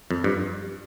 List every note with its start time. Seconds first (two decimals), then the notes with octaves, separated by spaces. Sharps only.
0.11 F2
0.24 G2